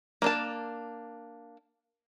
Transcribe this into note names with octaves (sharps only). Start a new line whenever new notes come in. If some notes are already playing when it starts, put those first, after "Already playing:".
A#3 D4 A5